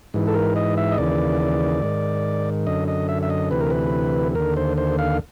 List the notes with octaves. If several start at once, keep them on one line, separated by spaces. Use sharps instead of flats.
G#2 E3
A4
A#4
D#5
E5
D#5
D#2 C#3 E3 D5
G#2 D#3
F#2 D3 D#5
D#5
E5
E5
D#5
D2 C3 E3 B4
A#4
B4
D#2 D3 A#4
C5
C5
F5